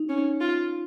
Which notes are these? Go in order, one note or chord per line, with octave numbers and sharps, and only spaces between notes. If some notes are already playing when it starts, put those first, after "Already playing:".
Already playing: D#4
C#4
F4